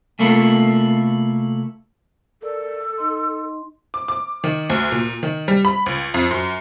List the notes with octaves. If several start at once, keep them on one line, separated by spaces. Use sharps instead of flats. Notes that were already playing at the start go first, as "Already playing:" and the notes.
C3 A3 A#3 E4 F4 A4
A4 A#4 D5
D#4 D#5 C6
D6
D6
D#3
D2
A#2
D#3
G3
B5
C#2
F2
F#2